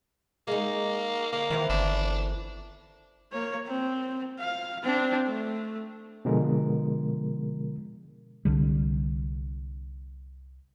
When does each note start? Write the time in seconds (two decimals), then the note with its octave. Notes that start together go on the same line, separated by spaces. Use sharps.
0.47 G#3 A#3 D#4
1.32 D3 A#3
1.50 D#3 E3 C4 E4
1.69 G1 D4
3.33 A#3 C#5
3.67 C4
4.39 F5
4.83 C4 D4
5.27 A3
6.25 B2 D3 F3 G#3 A#4
8.45 C2 D3 G3